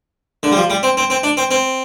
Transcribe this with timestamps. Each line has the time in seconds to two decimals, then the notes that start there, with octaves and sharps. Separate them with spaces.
0.43 D3
0.52 G3
0.57 F3
0.70 G3
0.83 C4
0.97 C4
1.10 C4
1.23 D4
1.37 C4
1.51 C4